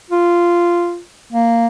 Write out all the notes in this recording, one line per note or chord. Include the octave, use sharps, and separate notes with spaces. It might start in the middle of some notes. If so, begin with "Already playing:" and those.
F4
A#3